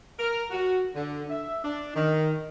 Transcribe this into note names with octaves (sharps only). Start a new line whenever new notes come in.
A#4
F#4
D3
E5
D4
D#3